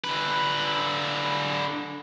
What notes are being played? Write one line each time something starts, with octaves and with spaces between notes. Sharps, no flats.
D3 B4